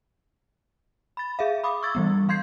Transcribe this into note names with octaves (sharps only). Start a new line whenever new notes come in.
B5 A6
G#4 E5 F5
B5 D6 D#6
C#6 E6 G#6 A6
E3 G3 B3
E3 F5 C6 G6 G#6 C7